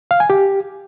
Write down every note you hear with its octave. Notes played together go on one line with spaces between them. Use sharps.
F5
G#5
G4